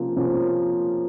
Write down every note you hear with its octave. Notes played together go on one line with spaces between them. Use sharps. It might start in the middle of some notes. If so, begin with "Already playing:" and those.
Already playing: C3 F3 A#3 C#4 F4
C3 F3 A#3 C#4 F4